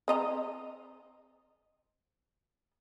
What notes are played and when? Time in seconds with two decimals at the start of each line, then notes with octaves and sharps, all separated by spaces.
0.08 C4 D#5 A#5